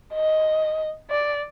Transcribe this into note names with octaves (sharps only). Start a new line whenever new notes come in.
D#5
D5